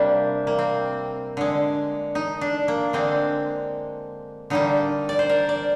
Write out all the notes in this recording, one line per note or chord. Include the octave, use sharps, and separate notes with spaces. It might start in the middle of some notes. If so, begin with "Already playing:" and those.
Already playing: C3 G3 A#3 D4
A#3
C4
D3 G#3
D#4
D4
A#3
D3 G#3 C4
D3 G3 A#3 D#4
D5
C5
A#4
D5